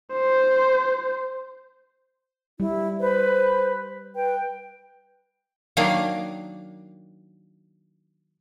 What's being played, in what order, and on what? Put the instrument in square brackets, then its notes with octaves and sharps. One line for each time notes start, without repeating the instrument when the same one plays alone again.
[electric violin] C5
[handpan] G3 [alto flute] E4
[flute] B4 [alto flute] C5
[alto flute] B4 [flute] G5
[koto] D#3 F#3 A#3 D4 D5 F5